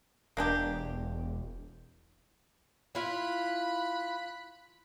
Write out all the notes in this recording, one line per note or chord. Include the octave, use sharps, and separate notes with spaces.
E1 A#3 D4 G4
E4 F4 B5 F#6